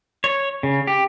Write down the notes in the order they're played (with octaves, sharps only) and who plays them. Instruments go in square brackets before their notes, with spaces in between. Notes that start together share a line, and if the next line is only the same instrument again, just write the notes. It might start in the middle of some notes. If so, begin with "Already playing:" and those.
[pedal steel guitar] C#5
C#3
G4